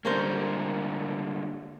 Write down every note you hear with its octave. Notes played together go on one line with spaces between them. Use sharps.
D3 G3 A#3 C#4 A#4 C5